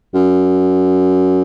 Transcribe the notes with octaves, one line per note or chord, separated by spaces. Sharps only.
F#2